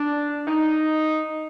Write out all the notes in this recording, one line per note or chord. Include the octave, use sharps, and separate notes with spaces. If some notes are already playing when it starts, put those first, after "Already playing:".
Already playing: D4
D#4